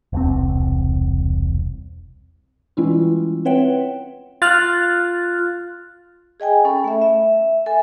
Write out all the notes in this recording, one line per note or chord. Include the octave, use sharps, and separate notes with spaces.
E1 C2 C4
E3 G3 G#3 C#4 E4 F4
C4 B4 C#5 E5 F#5 G5
F4 F6 F#6 A6
G#4 D#5 G5 G#5
C#4 A4 B5
A3 E5
E5
A4 E5 G#5